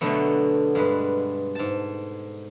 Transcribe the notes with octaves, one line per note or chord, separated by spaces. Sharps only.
B2 D3 F#3 A3 B3
G2 G#3 B4
G#2 A5